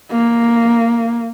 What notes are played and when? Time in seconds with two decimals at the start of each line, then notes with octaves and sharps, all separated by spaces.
0.11 A#3